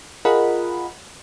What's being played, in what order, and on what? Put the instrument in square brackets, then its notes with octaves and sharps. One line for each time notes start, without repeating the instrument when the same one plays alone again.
[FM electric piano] F4 G#4 A#4 D#5 F#5 B5